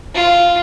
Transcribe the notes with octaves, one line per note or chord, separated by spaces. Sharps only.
F4